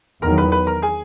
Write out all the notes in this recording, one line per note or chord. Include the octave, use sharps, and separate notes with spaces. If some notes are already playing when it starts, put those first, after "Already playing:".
E2 D#3 F#3 A#4 A#5
B4 B5
B4 B5
A#4 A#5
G#4 G#5